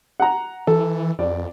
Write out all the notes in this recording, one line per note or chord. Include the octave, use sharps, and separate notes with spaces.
F#5 A#5
E3 A4
F2 D5